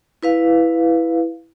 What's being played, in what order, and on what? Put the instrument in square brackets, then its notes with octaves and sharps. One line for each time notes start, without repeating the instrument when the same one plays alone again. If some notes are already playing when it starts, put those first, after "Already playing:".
[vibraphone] E4 B4 F5